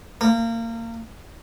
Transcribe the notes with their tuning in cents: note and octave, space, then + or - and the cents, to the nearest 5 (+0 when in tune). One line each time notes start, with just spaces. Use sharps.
A#3 -25